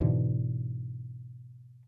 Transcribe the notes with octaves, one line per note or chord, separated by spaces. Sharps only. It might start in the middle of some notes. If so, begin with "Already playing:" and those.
G#2 B2 D3 E3